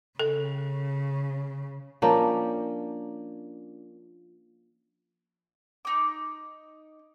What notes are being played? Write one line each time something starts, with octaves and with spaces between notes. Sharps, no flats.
C#3 A4
F3 A#3 C#4 D4
D#4 D6